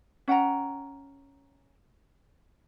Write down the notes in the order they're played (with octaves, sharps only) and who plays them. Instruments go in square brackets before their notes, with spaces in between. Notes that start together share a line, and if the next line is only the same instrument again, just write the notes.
[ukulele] C#4 F#5 G5 A#5